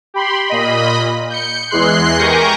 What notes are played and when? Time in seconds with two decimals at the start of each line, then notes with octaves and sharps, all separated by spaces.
0.14 G4 B5 C6
0.47 A#2 D#5 B5
1.30 G6 C#7
1.70 E2 E3 G#3 C6 F#6 C7
2.19 G4 A#4 G#5 C#6 G6 A#6